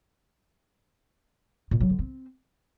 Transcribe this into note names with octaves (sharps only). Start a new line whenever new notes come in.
A#2
F#3
D3
C4